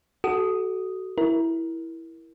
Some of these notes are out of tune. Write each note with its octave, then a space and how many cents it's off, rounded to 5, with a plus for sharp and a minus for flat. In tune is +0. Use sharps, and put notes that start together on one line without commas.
F#4 +20 A4 -20 D#6 +0
E4 +0 A#4 +15